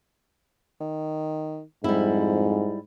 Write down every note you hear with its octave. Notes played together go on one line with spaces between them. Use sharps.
D#3
F2 G#2 G3 E4